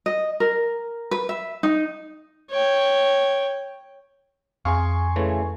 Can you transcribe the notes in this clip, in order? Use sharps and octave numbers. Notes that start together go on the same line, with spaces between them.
D#5
A#4
B4
E5
D#4
C#5 G5
F2 C4 G#4 F5 G#5 C6 C#6
C#3 E3 A3